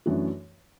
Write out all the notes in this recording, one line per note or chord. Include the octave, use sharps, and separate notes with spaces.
F#2 E3 A3 D4 F#4